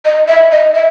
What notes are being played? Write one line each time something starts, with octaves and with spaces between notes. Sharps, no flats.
D#5
E5
D#5
E5